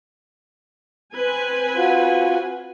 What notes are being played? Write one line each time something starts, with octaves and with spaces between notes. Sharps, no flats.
C4 B4 G#5
F4 F#4